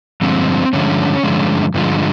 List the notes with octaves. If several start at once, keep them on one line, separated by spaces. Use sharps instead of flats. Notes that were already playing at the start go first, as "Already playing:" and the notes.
G2 D3 F3 G#3 C4
G2 D3 F3 G#3 C#4
G2 D3 F3 G#3
G2 D3 F3 G#3